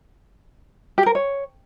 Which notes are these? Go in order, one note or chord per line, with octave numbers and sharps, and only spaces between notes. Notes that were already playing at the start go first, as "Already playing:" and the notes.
G4
A#4
C#5